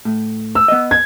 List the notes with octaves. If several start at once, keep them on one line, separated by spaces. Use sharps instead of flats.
A2
E6
B3 D#5
G#6